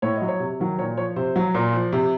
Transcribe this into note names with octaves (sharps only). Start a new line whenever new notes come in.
A2 C#5
D#5
F#3
C#5
C3
D#3 F#3
A#2 C#5
F3 C#5
C3 C5
F#3
A#2
F3
C3